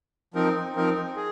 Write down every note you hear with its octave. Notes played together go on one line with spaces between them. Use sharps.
F3 C4 D#4 A#4
F3 C4 D#4 A#4
G#4